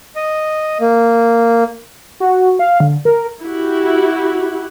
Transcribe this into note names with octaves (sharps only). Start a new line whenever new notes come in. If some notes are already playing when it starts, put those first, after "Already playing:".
D#5
A#3
F#4
F5
D3
A#4
E4 F#4 G4